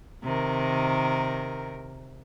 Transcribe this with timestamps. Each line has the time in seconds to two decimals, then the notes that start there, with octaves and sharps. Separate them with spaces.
0.24 C3 D#3 A#4